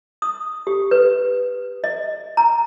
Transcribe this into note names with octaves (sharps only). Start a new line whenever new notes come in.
D#6
G4
B4
D#5
A#5